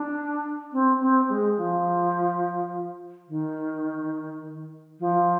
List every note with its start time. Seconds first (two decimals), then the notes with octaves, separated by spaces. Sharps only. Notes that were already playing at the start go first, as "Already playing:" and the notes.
Already playing: D4
0.73 C4
1.01 C4
1.29 G#3
1.57 F3
3.29 D#3
5.00 F3